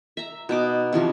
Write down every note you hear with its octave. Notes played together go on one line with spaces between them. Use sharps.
E5 A#5
B2 D#4 D6
C3 E3 F3 C#4